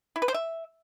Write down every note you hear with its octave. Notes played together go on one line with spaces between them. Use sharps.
E4
B4
C5
E5